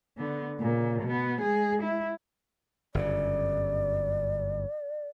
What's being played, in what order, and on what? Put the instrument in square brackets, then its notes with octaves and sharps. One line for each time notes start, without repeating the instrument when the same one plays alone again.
[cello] D3 B3
A#2 C#3
B2 B3
G#3 G#4
E4
[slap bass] G1 F#2 C#3 [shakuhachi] D5